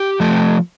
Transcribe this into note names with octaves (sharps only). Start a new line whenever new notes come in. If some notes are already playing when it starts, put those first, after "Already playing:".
Already playing: G4
F3 A3